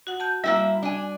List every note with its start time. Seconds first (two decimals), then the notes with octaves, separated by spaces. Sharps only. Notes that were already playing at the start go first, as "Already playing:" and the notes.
0.07 F#4 F#5
0.20 A5 G6
0.44 G3 A#3 E4 E5
0.82 D4 G#5